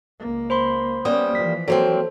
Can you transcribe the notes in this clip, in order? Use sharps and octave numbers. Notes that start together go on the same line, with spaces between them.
C#2 A#3
C5 B5 C6
G3 A#3 B3 C#4 C5 D#6
E3 F3 B6
F#3 A#3 C4 A4 C5